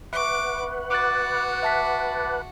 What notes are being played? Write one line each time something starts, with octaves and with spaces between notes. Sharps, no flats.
B4 E5 F#5 C#6 D6
F#4 D6 F#6 A6
E5 A5 B6